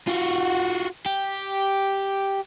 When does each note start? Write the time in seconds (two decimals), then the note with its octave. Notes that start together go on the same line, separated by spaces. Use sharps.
0.07 F4 F#4
1.06 G4